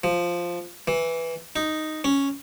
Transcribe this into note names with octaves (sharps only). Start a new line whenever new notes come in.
F3
E3
D#4
C#4